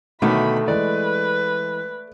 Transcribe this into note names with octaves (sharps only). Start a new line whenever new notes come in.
B2 D3 D#3 F#3 A3 B5
E3 G#3 B4 D5